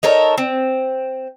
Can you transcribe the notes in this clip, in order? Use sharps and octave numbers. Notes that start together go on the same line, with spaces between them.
D#4 A4 A#4 C#5
C4